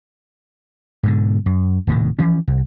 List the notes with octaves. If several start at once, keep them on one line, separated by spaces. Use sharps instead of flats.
G#2 B2 D3
F#2
D#1 A2 C3 D#3
E3 F3 C#4
C2